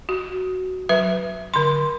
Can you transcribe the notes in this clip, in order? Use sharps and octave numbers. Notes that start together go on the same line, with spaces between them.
F#4
F#3 B4 E5
D3 C6